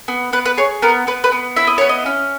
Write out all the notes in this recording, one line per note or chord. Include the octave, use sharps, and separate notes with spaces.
B3
B3 B4
B4
G#4 C#5
B3 A#4
B3 B4
B4
B3
E4 E5
D#5
B3 C#5
D#5
C#4